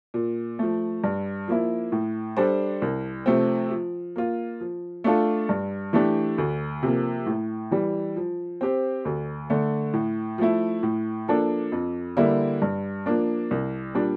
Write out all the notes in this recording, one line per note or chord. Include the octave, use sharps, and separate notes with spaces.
A#2
F3 A3
G2
F3 A#3 E4
A2
G3 D4 A4 C5
C2
C3 F3 A3 C4
F3
A#3 F4
F3
A3 D4 F4 A4
G2
E3 A3 D4 G4
D2
C3 F3 A#3
A2
E3 G3
F3
C4 G4 C5
D2
D3 A3
A2
F3 A3 E4
A2
F3 A#3 D4 A4
F2
D3 G3 A#3 E4
G2
F3 A#3 D4
C2
A#2 G3 D4